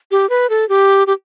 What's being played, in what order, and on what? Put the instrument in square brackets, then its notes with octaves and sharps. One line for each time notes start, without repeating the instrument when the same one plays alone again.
[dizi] G4
B4
A4
G4
G4